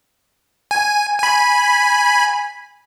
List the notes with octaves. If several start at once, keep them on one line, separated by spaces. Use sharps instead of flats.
G#5
G#5 B5